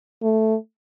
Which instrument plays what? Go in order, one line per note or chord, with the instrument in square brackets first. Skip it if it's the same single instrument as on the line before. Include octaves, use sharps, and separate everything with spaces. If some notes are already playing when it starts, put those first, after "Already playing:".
[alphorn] A3